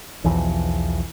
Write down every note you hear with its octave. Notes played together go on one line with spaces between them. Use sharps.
B1 E2 E3 F3